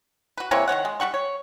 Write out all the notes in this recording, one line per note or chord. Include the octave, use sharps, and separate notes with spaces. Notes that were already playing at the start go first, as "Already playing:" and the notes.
F#4 B4
C3 E3 A#3 C#5
D#3 C4 C#5 F#5
G#3
G3 G4 F#5 C#6
C#5